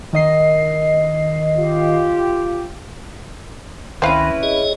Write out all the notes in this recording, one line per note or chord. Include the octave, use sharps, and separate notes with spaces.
D#3 D#5 C7
F4 G4
C#2 D#3 C4 C#4 E4 B4 F5
G#4 C#5 D#5